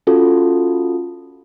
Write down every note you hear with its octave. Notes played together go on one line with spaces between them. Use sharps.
C#4 F4 F#4 A4